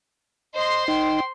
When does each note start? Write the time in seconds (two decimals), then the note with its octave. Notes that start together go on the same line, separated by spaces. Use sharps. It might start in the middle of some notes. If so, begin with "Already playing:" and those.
0.54 C5 D#5 C6
0.88 D#4 G5